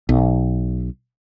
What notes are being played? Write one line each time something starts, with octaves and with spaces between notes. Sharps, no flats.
B1